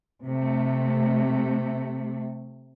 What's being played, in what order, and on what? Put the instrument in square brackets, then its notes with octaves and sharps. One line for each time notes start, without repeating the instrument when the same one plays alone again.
[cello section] C3 A3